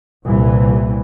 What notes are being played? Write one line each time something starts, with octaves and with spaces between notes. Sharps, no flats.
C2 A#2 E3